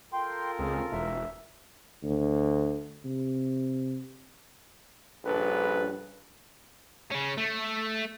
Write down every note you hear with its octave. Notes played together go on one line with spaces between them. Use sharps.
F4 A4 A#4 G5 C6
C#2 C4 G#4
E1 E5
D2
C3
A#1 G2 C#3 A4 B4
C#3 C#4
A3